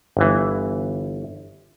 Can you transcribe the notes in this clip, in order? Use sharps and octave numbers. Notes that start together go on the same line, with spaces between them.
G1 E3